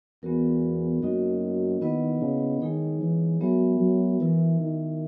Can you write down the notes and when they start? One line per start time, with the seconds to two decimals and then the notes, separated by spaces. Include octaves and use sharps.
0.23 E2 G#3 B3 F#4 A#4
1.02 F#2 A#3 D#4 F#4 A#4 D#5
1.81 D#3 B3 E4 B4 D#5 F#5
2.22 C#3
2.61 D#3 G#3 D#4 G#4 C#5
3.01 E3
3.41 F#3 G#3 B3 F#4 A#4 E5
3.80 F#3
4.20 E3 E4 A#4 E5
4.59 D#3